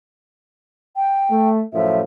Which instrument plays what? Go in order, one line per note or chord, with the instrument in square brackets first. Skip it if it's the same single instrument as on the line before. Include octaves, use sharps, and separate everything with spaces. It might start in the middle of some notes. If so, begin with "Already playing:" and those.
[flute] G5
[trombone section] A3
[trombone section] F#2 A2 F3 [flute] E5